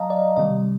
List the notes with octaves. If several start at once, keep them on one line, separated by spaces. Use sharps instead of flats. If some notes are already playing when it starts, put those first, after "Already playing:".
Already playing: F#3 D#5 F5 A5 A#5
D5
C3 D#3 G3 D#5